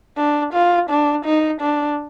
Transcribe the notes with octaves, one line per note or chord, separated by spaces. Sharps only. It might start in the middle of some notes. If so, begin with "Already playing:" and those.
D4
F4
D4
D#4
D4